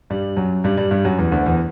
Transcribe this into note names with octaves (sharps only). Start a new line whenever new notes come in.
G2 G3
F#2 F#3
G2 G3
G2 G3
G2 G3
F#2 F#3
E2 E3
D2 D3
E2 E3